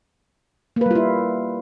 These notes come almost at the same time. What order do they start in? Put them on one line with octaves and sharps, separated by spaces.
A#3 B4 G3 F4 E4